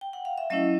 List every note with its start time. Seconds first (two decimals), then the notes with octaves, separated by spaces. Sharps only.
0.01 G5
0.13 F#5
0.25 F5
0.38 E5
0.50 F#3 A3 C#4 E4 D#5